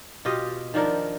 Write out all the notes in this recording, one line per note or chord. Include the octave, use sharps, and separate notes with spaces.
B2 F4 G4 D#5
D#3 F3 D4 A#4